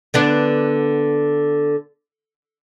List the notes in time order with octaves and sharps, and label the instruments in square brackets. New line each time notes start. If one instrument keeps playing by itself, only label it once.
[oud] D3 B3 D4